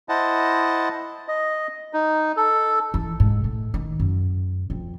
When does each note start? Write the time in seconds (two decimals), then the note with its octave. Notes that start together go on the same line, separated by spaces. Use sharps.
0.09 E4 C5 D#5 F#5 A5
1.28 D#5
1.93 D#4
2.37 A4
2.94 E3
3.20 G#2
3.44 A2
3.74 D#3
4.00 F#2
4.70 F2